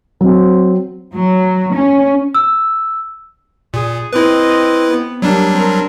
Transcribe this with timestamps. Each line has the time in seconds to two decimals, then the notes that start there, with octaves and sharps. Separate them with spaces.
0.21 F#3 C4
1.16 F#3
1.75 C#4
2.35 E6
3.74 A#2 G#4
4.13 C4 E4 B4 D#5
4.90 B3
5.22 F#3 G3 A#3 D4 G4
5.54 C4 A#4